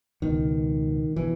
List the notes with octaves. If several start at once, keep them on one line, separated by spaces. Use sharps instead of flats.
C#2 B2 D#3
B2 E3